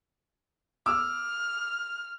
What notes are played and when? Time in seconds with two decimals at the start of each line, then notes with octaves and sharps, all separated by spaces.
0.86 D6 E6 F6